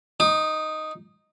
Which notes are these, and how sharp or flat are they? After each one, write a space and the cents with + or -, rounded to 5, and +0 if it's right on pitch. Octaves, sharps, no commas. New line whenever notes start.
D#4 +0 D#6 -45